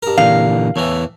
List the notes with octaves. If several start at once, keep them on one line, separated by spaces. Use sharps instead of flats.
G2 A#4
A#2 D3 E3 F5
E2 A2 E3 C#5